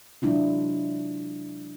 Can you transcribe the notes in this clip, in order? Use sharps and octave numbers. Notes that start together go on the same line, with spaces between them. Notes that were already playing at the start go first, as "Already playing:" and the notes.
C3 F#3 G#3 D4 E4 F4